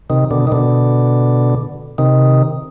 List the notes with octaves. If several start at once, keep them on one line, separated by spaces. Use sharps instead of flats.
C3 D#3
B2 D3
D#3
B2 D3
C3 D#3